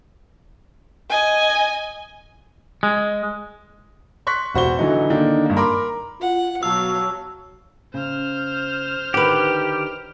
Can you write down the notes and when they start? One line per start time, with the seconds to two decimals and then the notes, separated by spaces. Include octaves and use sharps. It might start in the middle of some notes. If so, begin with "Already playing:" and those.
1.10 D#5 G#5
2.83 G#3
4.27 C6 C#6 F#6 B6
4.54 E1 F#4 C5 C#6 G7
4.79 D3 E3 F#3 D#4
5.10 D3 D#3 A#3 D4 D#4
5.45 G2 A#3
5.56 A#4 B5 C6 D6
6.21 F4 F#5
6.63 B2 F#3 F5 A5 E6
7.94 C#3 C5 F6
9.14 D3 D#3 D#4 F#4 G4 B4